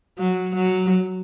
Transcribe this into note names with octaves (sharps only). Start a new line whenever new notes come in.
F#3
F#3